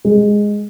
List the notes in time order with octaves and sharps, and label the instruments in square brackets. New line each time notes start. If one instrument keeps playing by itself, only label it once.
[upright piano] G#3